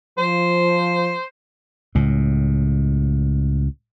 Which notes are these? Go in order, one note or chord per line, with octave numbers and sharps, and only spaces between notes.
F3 C5
C#2 A2